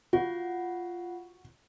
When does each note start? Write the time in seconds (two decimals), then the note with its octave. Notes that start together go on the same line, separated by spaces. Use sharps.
0.13 F4 F#4 F#5